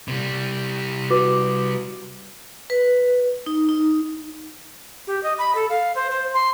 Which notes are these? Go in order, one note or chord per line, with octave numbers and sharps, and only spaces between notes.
C3 G3
F#4 B4 D6
B4
D#4
D#4
G4
D#5
B5
A4
F5
C5
C5
C6